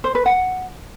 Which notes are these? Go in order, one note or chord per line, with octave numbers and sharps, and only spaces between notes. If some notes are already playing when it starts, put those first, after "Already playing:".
C5
B4
F#5